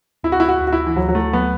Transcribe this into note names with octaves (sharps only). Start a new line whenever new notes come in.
D2 E4
F#4
E4
F#4
D2
F#4
E4
E3
D2 F#3
F#3
A3
F#3 B3